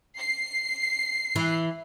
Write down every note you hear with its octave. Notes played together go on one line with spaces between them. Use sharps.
C7
E3